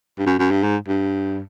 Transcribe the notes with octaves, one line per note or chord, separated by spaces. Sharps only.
G2
F#2
F#2
G2
G#2
G2